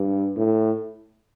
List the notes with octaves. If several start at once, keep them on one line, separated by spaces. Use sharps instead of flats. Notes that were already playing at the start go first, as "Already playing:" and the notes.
Already playing: G2
A2